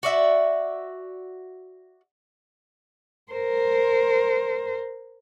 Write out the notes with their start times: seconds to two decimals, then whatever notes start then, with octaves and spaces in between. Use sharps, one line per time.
0.03 F#4 D5 E5
3.32 A#4 C5